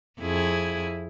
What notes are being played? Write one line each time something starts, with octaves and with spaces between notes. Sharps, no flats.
F2 E4 G#4